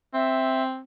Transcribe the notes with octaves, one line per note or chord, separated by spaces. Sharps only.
C4 E5